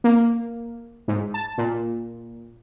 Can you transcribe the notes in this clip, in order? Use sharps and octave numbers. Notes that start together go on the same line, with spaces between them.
A#3
G#2
A5
A#2